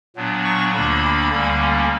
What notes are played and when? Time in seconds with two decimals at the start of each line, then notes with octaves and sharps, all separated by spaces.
0.16 A#2 F#3 B3 D4
0.44 C#6
0.73 D2 D3 A#3 D4 B5
1.31 D2 D3 G3 A#3 C#4